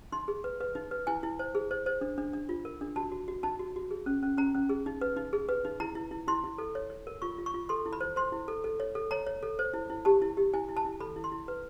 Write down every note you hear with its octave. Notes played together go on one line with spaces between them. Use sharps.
D#4 C6
G#4
B4
B4
D#4
B4
E4 G#5
E4
C5
G#4
C5
C5
D4
D4
D4
F4
A#4
D4
F#4 A5
F#4
F#4
D#4 A5
F#4
F#4
G#4
C#4
C#4
C#4 A#5
C#4
G#4
D#4
B4
D#4
G#4
B4
D#4
E4 A#5
E4
E4
E4 C6
E4
A4
C#5
C#5
A#4
F4 C#6
F4
C#6
F4
A4 C6
E4
B5
C5
C5 C6
E4
A4
A4
C#5
A4
C#5 A#5
C#5
A4
C5
E4
E4
G4 A5
E4
G4
E4 G#5
E4
A5
E4
A4 B5
E4
C6
E4
B4